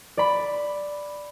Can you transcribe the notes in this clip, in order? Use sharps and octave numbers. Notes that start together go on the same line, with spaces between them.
D5 B5